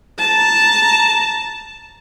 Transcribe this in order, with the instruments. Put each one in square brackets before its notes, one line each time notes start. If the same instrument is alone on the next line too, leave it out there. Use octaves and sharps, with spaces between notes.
[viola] A5 A#5